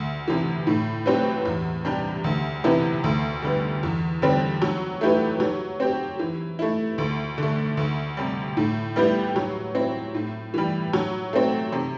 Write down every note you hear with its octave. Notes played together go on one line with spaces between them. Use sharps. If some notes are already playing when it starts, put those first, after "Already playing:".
Already playing: D2
C3 E3
A2
F#3 C4 G4 B4
E2
C3 G3 D4 G4
D2
C3 E3 B3 E4
D2
D3 G3 B3
E2
D3 G3 C4
F#3
A3 E4 G4 B4
F#3
C4 G4
E3
A3 E4
D2
D3 A3
D2
C3 G3
A2
G3 B3 E4 G4
F#3
C4 E4
A2
E3 G3
F#3
A3 C4
C3